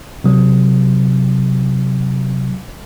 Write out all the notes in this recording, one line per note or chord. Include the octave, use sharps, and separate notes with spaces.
C3 F#3